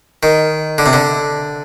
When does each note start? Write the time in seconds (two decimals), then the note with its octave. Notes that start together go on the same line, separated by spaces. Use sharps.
0.23 D#3
0.78 D3
0.86 C3
0.93 D3